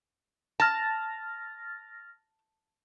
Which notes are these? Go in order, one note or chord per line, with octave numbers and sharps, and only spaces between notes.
A5 F6 A6 A#6